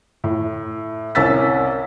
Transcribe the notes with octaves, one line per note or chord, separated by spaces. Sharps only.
A2
C2 C#4 A#4 E6 A6 B6